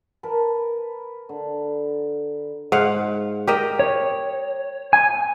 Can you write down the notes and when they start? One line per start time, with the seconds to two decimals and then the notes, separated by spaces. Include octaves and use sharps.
0.23 A#4 B4 A5 A#5
1.29 D3
2.72 G#2 F5 F#5
3.47 G4 A#4 D#5
3.79 C#5
4.93 G#5